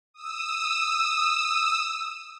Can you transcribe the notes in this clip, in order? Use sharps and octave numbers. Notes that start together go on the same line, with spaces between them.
D#6 E6